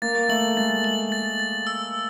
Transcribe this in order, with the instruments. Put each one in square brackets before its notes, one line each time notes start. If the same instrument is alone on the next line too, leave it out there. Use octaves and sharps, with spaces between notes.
[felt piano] A#3 [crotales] A6
[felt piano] A3 [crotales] F#7
[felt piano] G#3 [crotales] A6
[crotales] F#7
A6
A6
E6